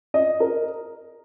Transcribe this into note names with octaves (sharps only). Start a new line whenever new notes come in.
D#5
A#4